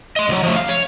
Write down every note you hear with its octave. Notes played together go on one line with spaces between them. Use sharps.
D#5 C6
C#2 F#3
F3 A3
F5
C#5